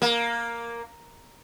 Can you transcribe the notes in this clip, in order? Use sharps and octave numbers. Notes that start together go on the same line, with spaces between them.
A#3